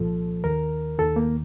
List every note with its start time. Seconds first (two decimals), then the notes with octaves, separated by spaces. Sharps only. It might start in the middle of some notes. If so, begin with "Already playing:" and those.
Already playing: C2 A#2 F3 A4
0.44 D#2 D#3 A#4
0.98 D#2 D#3 A4
1.16 A#3